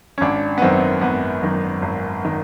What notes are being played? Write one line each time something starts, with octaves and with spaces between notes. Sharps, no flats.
C#4
G#1 D4
B3
F#2 D#3 C4
G#1 B3
F#2 D#3
G#1
D#3